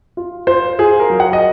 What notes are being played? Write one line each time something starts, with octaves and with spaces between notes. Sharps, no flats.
F4
F4 C5
F4 G#4
A#4
F#3
F#5
D#5